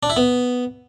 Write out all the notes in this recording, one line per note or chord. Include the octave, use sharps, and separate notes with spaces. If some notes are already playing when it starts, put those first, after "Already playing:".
D4
E4
B3